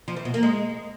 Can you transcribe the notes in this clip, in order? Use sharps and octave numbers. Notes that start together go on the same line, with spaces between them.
F3
E3
B2
A#3
G#3